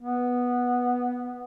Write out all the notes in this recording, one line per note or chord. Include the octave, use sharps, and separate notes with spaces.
B3